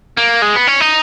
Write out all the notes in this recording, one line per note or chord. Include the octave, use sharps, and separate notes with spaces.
A#3
G#3
B3
C#4
D#4